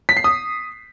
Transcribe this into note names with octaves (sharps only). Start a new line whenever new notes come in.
B6
C7
D#6